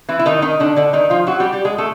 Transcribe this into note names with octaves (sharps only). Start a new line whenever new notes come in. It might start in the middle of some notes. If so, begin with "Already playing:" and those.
E3 E4
E4
D#3 D#4
D#3 D#4
D3 D4
D3 D4
D#3 D#4
F3 F4
F#3 F#4
G3 G4
G3 G4
G#3 G#4
A3 A4